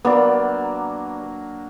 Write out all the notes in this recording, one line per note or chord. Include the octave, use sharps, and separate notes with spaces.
F#3 A#3 B3 D4 D5